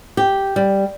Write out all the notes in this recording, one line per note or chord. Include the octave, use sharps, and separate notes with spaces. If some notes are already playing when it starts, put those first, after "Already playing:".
G4
G3